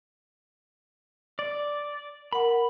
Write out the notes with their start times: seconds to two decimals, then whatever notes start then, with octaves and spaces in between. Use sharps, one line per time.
1.39 D5
2.33 A#4 F#5 B5